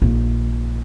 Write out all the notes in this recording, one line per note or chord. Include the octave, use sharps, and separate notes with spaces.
A#1 D#3